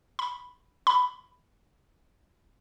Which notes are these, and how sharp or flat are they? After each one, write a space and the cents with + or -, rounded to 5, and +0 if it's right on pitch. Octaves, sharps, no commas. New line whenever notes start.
B5 +0
B5 +10